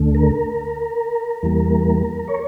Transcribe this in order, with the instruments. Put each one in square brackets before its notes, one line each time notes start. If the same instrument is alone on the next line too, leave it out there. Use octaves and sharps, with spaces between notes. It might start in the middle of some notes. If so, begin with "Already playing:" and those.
Already playing: [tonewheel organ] D2 D3 A3
A#4
E2 E3 G3 A#3
C#5